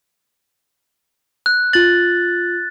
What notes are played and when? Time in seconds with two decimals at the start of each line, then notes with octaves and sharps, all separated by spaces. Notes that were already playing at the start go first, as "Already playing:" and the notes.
1.46 F#6
1.73 F4 A6 F#7